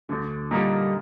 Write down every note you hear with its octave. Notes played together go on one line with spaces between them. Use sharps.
D2 D3
A#2 D3 G3 A#3 D#4